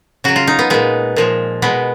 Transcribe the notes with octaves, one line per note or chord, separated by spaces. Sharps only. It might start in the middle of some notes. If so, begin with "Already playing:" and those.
C#3 F#3 F#4
F4
D#4
B3
A#2 G#3 B3
A#2 F3 G#3
B2 G#3 B3